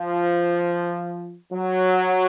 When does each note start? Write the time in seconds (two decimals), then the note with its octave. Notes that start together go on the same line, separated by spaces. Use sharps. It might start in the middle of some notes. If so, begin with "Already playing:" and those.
Already playing: F3
1.52 F#3